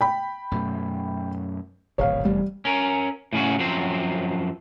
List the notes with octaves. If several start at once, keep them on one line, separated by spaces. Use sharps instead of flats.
G5 B5
F#2 B2 A3
D1 G#1 B2 C#5 F5
F1 E2 G3
C#4 A#4
A2 C#3 C#4 F#4
F#2 F3 F#3 C4 C5